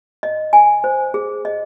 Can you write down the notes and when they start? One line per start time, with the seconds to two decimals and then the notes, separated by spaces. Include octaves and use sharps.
0.23 D#5
0.53 G#5
0.84 C5
1.14 G#4
1.45 D#5